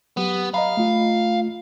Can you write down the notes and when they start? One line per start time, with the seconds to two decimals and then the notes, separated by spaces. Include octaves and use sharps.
0.17 F#3 B3 G4
0.54 D#5 F5 A#5 B5
0.77 A3 F4